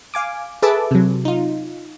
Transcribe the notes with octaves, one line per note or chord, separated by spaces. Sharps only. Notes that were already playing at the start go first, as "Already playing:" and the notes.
F5 G#5 D6
G#4 A4 B4 E5 A5 D6
C3 F#3
D#4 F4